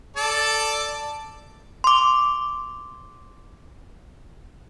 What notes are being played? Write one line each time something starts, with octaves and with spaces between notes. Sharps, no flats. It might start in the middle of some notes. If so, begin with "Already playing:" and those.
A4 D5 A5
C6 D6